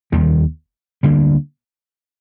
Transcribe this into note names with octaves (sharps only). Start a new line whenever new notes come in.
F1 D#2 D#3 G3
D2 D3 G3 A#3